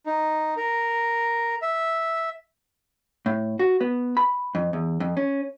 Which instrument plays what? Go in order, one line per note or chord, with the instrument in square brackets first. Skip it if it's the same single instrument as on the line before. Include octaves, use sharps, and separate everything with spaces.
[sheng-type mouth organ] D#4
A#4
E5
[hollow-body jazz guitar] A2
F#4
B3
B5
F2
E2
F2
C#4